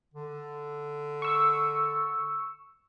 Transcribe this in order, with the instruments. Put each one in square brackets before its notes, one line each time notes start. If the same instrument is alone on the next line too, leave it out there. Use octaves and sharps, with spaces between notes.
[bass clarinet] D3
[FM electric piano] C#6 E6